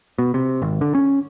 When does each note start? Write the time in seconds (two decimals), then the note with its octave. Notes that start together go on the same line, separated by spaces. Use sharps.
0.18 B2
0.34 C3
0.62 G#1
0.81 D3
0.95 C#4